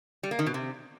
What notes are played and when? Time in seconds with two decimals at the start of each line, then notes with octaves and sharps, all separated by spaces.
0.23 G3
0.31 A#3
0.39 D#3
0.46 B2
0.54 C3